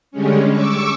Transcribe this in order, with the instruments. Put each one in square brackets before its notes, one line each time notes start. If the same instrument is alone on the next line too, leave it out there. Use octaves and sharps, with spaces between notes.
[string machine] D3 G3 G#3 C#4
C#6 D6 E6